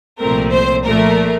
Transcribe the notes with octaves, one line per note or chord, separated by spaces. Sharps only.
C2 A#2 F3 A3 C4 A#4
C5
A#2 F3 A3 A#4